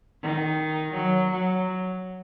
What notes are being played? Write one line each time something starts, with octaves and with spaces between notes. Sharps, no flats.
D#3
F#3
F#3